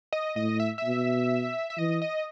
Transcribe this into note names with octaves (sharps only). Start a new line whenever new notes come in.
D#5
A2 D#5
E5
E5
B2
E5
E3 D#5
D#5